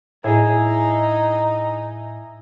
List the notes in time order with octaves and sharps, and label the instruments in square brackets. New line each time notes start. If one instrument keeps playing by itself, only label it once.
[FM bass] A2 [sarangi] D#4 [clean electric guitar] E4 G#4